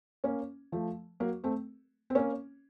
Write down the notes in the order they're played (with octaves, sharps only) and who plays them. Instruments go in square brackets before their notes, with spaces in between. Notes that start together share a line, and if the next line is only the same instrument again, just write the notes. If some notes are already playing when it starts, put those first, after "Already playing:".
[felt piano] A#3 C#4
F3 A3
F#3 A#3
A3 C4
C4
A#3 C#4